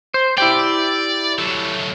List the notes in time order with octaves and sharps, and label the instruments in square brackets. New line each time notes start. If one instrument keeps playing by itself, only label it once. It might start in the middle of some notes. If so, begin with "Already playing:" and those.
[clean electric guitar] C5
[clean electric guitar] E4 G4 G5 [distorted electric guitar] D5
[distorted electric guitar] F#3 A3